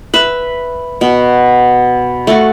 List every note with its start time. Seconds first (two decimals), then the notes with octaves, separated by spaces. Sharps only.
0.14 B4 E5
1.01 B2
2.27 A3 F#4